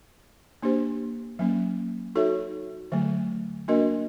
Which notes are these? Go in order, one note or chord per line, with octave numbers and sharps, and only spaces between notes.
A#3 D4 G4 C5
F#3 A#3 C#4
D#4 F#4 A4 C#5 E5
D3 F#3 A3
A#3 D4 F#4 A#4 D#5